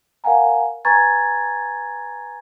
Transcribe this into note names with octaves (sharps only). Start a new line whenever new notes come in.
A#4 F5 F#5 G#5 A#5
B4 G#5 A#5 C#6 G#6 A6